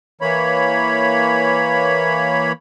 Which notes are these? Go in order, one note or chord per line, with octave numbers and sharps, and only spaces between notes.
E3 A#3 C#5 B5